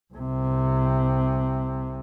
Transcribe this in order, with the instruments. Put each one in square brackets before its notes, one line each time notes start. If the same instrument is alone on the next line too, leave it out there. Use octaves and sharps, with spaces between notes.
[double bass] C2 C3